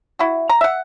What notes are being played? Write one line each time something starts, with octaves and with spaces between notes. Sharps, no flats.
E4 F#4
A#5
E5 F#5